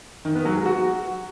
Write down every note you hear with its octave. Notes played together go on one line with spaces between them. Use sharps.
D#3
B3
F#3
G#3
F#4